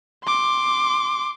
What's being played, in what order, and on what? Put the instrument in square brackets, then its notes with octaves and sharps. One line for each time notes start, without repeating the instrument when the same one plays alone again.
[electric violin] C6 D6